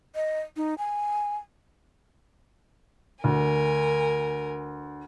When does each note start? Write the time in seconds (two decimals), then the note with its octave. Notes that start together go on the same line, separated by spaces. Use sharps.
0.15 D#5
0.57 D#4
0.78 G#5
3.24 D2 A#4 G#5